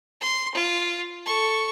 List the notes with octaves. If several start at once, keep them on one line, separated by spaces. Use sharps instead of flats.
C6
F4
A4 C#6